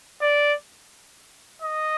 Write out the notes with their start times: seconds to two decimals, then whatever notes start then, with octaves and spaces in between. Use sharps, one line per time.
0.21 D5
1.62 D#5